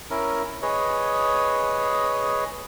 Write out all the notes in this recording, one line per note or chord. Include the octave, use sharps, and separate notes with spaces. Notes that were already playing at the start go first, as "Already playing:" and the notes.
C#4 E4 A#4
G#4 B4 C#5 D#5